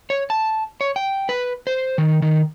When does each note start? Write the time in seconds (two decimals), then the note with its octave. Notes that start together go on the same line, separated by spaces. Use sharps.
0.10 C#5
0.30 A5
0.81 C#5
0.96 G5
1.29 B4
1.67 C5
1.98 D#3
2.22 D#3